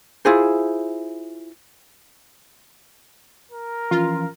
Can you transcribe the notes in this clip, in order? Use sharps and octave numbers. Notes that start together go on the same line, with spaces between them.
E4 F4 G#4 C5
A#4
E3 F3 C#4 F4